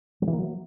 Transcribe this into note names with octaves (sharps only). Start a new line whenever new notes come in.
F#3
E3
A#3
F#3